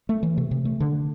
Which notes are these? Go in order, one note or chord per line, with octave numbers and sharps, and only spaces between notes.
A3
E3
C3
C3
A3
D3